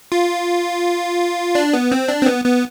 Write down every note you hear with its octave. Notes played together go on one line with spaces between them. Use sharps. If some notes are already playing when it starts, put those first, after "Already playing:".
F4
D4
B3
C4
D4
C4
B3
B3